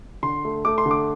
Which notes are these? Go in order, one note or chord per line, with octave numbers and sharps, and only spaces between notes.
D3 C6
A3
A3 D6
C6
D3
D6